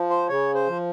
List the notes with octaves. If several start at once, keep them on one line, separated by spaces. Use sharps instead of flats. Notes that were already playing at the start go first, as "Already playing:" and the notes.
Already playing: F3
C5
C#3 C#5
C5
F3